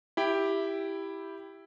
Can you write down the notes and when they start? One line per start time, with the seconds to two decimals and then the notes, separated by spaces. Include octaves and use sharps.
0.17 E4 G4 G5